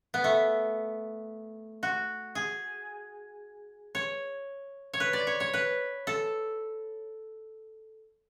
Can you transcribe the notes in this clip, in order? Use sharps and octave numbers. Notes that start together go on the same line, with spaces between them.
B3
A3
F#4
G#4
C#5
C#5
B4
D5
C#5
C#5
B4
A4